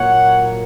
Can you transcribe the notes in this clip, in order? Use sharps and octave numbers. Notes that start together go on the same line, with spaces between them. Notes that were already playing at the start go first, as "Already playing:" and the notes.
Already playing: A#2 F#3 A#3 C#5 F#5